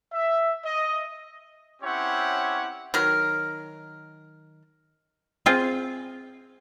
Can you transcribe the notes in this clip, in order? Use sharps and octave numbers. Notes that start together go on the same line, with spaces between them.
E5
D#5
C4 C#4 E4 G4 C#5 F#5
D#3 F#3 A#4
C4 F4 G#4